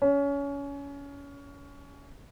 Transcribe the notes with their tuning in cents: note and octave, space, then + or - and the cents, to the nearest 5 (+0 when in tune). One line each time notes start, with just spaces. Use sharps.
C#4 +25